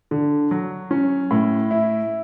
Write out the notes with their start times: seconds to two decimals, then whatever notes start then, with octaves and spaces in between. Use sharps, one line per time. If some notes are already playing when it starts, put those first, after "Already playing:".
0.11 D3
0.51 F#3
0.91 C#4
1.31 A2
1.71 E4